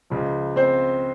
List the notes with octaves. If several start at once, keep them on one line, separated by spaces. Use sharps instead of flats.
C#2 C#3 F3
C4 C5